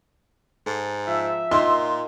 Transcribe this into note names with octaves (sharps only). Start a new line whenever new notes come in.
G#2 A4
F3 E5
A#2 D#4 F4 A#4 C6